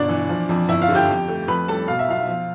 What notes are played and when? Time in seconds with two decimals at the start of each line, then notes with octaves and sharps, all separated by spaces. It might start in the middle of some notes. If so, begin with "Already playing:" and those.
Already playing: G1 B2 D4 D5
0.09 E3
0.29 F3
0.49 F2
0.69 G1 E4 E5
0.82 F4 F5
0.89 D3
0.95 G4 G5
1.08 F2
1.28 A3
1.48 F2 B4 B5
1.68 G3 A4 A5
1.88 B2 F5
1.99 E5
2.08 B1 F4 F5
2.28 F3